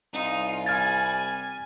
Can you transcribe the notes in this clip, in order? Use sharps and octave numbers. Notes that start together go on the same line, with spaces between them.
C2 D#4 F4 F5
G3 G#5 F6 G#6 A6